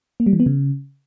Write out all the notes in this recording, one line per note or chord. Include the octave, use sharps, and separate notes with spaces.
A#3
G3
E3
B3
C#3